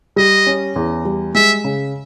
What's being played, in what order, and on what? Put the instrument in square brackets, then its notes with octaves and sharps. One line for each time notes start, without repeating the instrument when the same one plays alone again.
[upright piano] G3 [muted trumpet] D#5
[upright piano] C#4
E2
G3
[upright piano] G#3 [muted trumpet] E5
[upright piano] C#3